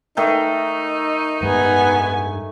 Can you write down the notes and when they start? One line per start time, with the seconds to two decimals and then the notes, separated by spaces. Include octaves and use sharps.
0.17 D#3 A3 D#4
1.43 G2 G#3 B3 G#5